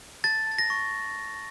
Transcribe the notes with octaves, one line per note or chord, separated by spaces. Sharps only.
A5 A6
A5 A6
A#6
C#6